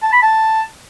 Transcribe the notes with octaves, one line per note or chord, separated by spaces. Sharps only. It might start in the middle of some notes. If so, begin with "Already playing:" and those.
A5
B5
A5